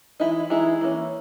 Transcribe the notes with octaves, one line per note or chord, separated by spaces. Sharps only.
E3 G#3 D#4 E4
E3 G#3 D#4 E4 G#4
E3 A#3 C#4